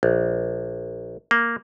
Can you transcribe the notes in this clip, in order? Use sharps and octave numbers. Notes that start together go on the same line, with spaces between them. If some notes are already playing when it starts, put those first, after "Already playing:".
A#1
A#3